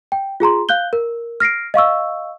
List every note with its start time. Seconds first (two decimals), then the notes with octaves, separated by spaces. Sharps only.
0.12 G5
0.40 F4 G#4 A#5 C6
0.69 F5 F#6 G6 G7
0.93 A#4
1.40 F6 A#6 C7 D7
1.74 D#5 F5 C#6 E6